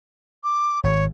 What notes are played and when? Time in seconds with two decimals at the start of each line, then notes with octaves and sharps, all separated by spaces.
0.44 D6
0.84 G#1 C#5